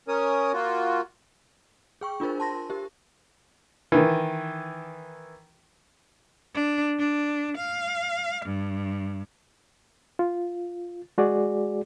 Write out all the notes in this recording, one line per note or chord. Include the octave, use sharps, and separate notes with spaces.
C#4 A#4 C#5 D#6
A#3 F4 F#4
G#4 G5 C#6
D4 F4 G#4 A#4 C5
A5 C6 A#6
G4 A#4
D#3 E3
D4
D4
F5
G2
F4
G#3 F#4 G#4 D5